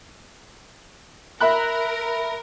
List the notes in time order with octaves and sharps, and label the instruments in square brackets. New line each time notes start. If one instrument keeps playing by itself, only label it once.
[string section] A#4 [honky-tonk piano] E5 B5 F#6